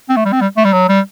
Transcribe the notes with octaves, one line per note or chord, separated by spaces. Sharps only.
C4
A3
G3
C4
G3
A3
G3
F#3
G3